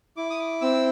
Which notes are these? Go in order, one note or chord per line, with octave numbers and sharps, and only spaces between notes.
E4 D6
D#6
D6
C4 E6